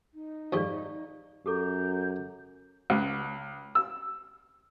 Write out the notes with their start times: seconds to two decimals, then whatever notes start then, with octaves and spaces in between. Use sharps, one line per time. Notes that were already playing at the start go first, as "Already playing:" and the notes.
0.13 D#4
0.53 F2 G#2 G3 D5 F5 C#6
1.46 F#2 G4 A4 A#5 D6 G6
2.90 C#2
3.75 E6